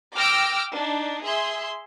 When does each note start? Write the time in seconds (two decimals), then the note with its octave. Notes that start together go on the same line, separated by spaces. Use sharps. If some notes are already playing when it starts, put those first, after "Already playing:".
0.16 G5 D6 E6 F6 A#6 D7
0.73 D4 D#4
1.24 G#4 E5 C6